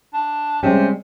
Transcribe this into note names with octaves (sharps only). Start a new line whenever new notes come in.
D4
C3 G3 G#3 C#4